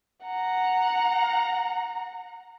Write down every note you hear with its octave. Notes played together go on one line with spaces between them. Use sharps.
F#5 A#5